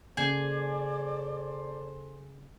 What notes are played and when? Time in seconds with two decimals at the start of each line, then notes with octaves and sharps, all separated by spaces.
0.17 F#1 G#4 A4 C5 D5